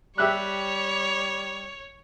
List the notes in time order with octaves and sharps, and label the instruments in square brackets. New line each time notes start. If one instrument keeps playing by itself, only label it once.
[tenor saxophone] G3 [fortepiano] G4 E5 F#6 [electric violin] C#5